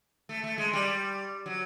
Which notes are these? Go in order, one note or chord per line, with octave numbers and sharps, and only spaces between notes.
A3
A3
G#3
G3
F#3